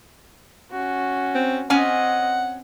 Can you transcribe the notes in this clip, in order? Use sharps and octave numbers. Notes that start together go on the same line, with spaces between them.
C#4 F#4
C4
C4 C#4 D#5 F#5 G#5